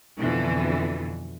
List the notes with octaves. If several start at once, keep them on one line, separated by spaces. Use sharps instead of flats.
F2 B2 D3 E3